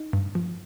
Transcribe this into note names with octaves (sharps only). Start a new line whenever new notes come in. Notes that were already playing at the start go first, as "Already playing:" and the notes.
Already playing: D#4
G2
F3